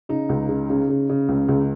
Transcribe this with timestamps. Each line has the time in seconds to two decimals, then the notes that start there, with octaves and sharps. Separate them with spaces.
0.09 C#3 D#4
0.29 C#2
0.49 C#3
0.70 C#3
0.89 C#3
1.10 C#3
1.29 C#2
1.48 C#2